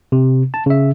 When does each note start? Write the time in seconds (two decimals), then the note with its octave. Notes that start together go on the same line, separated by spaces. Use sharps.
0.12 C3
0.54 A5
0.66 C#3 E5